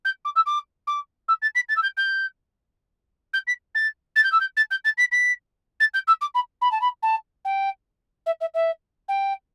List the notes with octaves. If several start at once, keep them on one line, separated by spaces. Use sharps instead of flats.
G6
D6
E6
D6
D6
E6
A6
B6
A6
E6
G6
G6
G6
B6
A6
A6
G6
E6
G6
A6
G6
A6
B6
B6
A6
G6
E6
D6
B5
B5
A5
B5
A5
G5
E5
E5
E5
G5